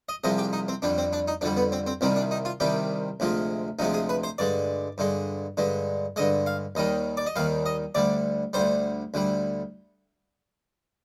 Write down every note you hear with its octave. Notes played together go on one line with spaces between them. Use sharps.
D#5
C2 C3 F3 G#3 D#5
G4
D#4
C4
F2 D3 G3 D4
C4
D4
D#4
F2 D3 G3 D4
B3
C4
C4
C2 C3 D#3 G3 C4
D4
D#4
F4
C2 C3 D#3 G3 G4
D2 C3 F3 G#3
D2 C3 F3 G#3 D#4
G#4
B4
C5
G2 D3 G#3 D5
G2 D3 G#3
G2 D3 G#3
G2 D3 G#3 D#5
F5
D#2 D#3 G3 D#5
D5
D#5
D#2 D#3 G3 F5
D#5
D2 D3 G3 D5
D2 D3 G3 C5
D2 D3 G3